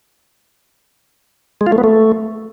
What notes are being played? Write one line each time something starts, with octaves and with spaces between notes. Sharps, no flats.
G#3
F4
A3
B3
A3